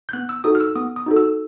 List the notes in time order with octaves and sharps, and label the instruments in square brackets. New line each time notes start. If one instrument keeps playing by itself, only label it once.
[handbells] G6
B3 F#6
E6
D#4 F#4 A4 D#6
F6
E6
B3 D#6
D#6
D#4 F#4 A4
E6